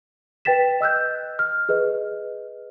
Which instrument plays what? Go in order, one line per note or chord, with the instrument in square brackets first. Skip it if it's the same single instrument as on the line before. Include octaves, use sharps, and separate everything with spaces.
[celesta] B4 G5 A6 B6 E7
D#5 E6 F#6 G6
F6
G#4 B4 D#5